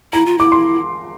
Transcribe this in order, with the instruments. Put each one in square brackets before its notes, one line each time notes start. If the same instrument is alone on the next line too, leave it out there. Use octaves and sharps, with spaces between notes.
[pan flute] E4 [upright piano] A#5
[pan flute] F4
[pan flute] E4 [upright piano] D6
[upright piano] C6